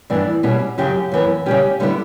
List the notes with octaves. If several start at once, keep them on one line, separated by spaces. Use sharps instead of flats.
G2 E3 B3 D4 D5
B2 G3 C#4 E4
F#2 C#3 F#3 G4
F#2 E3 B3
C#3 G3 C#4 G4
D3 G3 B3 E4